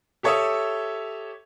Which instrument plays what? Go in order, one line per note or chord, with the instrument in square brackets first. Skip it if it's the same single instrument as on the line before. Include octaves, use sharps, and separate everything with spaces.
[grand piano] G4 A4 C#5 E5 D#6 E6